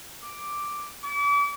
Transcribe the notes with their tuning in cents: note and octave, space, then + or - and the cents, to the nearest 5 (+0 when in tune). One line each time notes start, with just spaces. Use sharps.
D6 +0
D6 -40